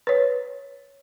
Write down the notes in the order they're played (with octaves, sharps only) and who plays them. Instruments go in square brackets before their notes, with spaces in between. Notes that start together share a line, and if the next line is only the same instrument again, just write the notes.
[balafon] B4 C#5